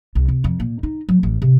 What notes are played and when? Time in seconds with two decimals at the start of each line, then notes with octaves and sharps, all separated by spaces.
0.15 C2
0.28 C3
0.44 F2
0.60 A#2
0.83 D#4
1.09 F#3
1.23 A1
1.42 C3